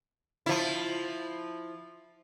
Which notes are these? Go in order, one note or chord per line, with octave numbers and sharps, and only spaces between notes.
F3 E4